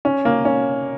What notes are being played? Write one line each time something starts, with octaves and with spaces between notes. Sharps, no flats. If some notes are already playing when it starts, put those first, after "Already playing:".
C#4
A#3
C#4